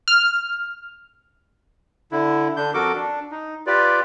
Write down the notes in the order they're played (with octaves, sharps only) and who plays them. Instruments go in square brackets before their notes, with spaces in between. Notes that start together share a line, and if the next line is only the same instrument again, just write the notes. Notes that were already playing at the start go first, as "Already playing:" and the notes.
[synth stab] F6
[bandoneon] D3 E4
D3 D4 G6
F2 F#4 A4 A#4 D6
D4
D#4
F4 G4 B4 D5